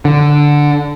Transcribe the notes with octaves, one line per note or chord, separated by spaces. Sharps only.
D3